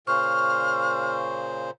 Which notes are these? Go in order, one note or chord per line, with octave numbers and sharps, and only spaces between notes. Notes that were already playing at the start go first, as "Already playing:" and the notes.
A#2 C#3 C5 C#6 F6